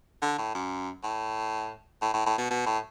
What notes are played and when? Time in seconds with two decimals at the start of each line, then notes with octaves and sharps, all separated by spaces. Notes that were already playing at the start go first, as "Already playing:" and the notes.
0.22 D3
0.38 A2
0.55 F#2
1.04 A2
2.02 A2
2.14 A2
2.26 A2
2.38 B2
2.51 B2
2.66 A2